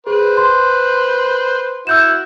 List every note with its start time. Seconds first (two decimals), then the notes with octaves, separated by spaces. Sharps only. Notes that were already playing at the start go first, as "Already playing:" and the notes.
0.07 G#4 B4 C5
0.37 C6
1.87 E4 F#4 E6 G6 E7